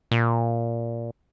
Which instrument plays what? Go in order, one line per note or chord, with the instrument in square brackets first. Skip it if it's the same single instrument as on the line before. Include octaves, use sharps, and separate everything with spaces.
[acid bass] A#2